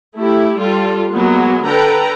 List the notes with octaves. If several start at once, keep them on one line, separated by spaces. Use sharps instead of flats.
A3 E4 G4
G3 F4 A4
F#3 G#3 A#3 B3
D3 A4 B4 G5 A#5